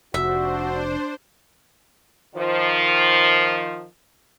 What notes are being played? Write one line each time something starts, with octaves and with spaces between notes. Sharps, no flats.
F1 D4 F#4 C5 E5
D#3 F3